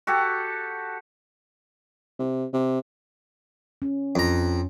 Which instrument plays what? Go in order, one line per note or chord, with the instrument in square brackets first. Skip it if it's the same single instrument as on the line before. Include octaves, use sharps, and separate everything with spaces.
[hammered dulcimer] F#4 G4 A4
[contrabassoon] C3
C3
[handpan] C#4
[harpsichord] F2 A#5